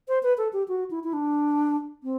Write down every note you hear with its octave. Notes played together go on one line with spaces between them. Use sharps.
C5
B4
A4
G4
F#4
E4
E4
D4
C4